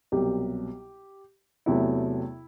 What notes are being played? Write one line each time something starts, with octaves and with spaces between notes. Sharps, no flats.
C2 B2 F#3 G4
E2 C3 F#3 A3 E4